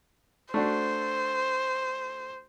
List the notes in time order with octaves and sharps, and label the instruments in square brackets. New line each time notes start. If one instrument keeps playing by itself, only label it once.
[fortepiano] A3 D4 F#4 [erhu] C5